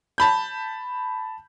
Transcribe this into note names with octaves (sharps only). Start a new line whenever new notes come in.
A5 B5 G6